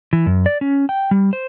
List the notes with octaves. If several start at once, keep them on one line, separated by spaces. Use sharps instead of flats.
E3
F#2
D5
C#4
G5
G3
C5